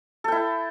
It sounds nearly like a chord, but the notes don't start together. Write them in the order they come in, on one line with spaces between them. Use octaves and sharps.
A4 G5 E4